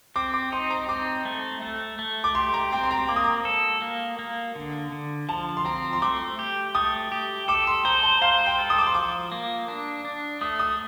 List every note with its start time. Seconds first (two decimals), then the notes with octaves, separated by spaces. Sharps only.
0.16 C4 D6
0.34 D6
0.52 D#4 C6
0.70 A#5
0.89 C4 D6
1.25 A3
1.62 A3
1.99 A3
2.24 D6
2.35 G4 C6
2.54 A#5
2.72 C4 G5
2.83 C6
2.91 A#5
3.08 A#3 D6
3.16 D#6
3.24 D6
3.45 A4
3.82 A#3
4.19 A#3
4.56 D3
4.92 D3
5.29 F3 A5
5.57 C6
5.65 C4 A#5
5.93 C6
6.02 A3 D6
6.39 G4
6.75 A3 D#6
7.12 G4
7.48 A4 D6
7.67 C6
7.85 C5 A#5
8.03 A5
8.22 C5 F5
8.46 G5
8.59 A4
8.70 D#6
8.78 D6
8.87 C6
8.94 F3 D6
9.32 A#3
9.68 D4
10.05 D4
10.41 A3 D#6
10.59 D#6